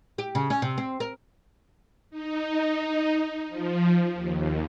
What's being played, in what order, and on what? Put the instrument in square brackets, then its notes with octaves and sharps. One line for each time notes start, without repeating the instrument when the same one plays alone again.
[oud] G4
C#3
C#4
C3
C4
A#4
[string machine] D#4
F3
D#2